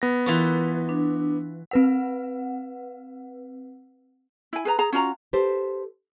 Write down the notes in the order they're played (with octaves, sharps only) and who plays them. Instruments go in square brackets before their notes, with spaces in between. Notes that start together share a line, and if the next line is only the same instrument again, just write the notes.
[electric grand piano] B3 A#6
[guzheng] E3 F4 F#4
[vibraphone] D4
[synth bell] C4 B4 F#5
[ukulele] E4 G#5
G#4 B4 A#5
G#4 A#5
C#4 F4 F#4 A#5
[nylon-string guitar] G4 A4 B4 C5